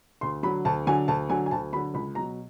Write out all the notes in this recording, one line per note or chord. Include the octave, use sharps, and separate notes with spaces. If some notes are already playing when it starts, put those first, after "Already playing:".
D2 C6
D3 F#3 B5
D2 A5
D3 F#3 G#5
D2 A5
D3 F#3 G#5
G#5
D2 A5
D3 F#3 B5
C#2 B5
B2 F#3 A#5